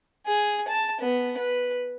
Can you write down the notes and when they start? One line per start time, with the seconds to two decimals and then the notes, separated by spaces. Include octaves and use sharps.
0.26 G#4
0.68 A5
1.01 B3
1.38 B4